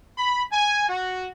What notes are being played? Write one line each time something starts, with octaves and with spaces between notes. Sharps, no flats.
B5
G#5
F#4